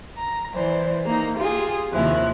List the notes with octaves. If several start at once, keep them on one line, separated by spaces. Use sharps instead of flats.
A#5
E3 C5 D5
A#3 D#4
F4 G4 G#4
D#2 C3 D#3 F3 E4 F#6